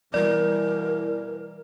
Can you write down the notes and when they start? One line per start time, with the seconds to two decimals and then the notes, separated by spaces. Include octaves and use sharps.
0.14 B2 E3 G3 A#4 D5